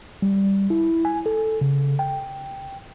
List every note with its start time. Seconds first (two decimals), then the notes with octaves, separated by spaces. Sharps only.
0.22 G3
0.70 E4
1.05 G#5
1.26 A4
1.61 C#3
1.99 G5